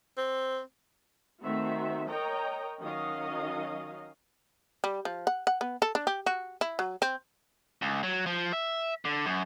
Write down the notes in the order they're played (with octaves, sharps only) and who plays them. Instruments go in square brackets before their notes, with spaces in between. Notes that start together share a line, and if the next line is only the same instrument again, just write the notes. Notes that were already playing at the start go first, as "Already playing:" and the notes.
[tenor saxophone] C4
[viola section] D#3 A3 C4 F#4 E5
A#4 C#5 D#5 G5 A#5
D#3 F#3 C#4 D#5 F5
[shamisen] G3
F3
F#5
F#5
B3
A4
D4
G4
F#4
E4
F#3
C4
[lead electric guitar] C#2
F#3
F3
E5
D3
F#2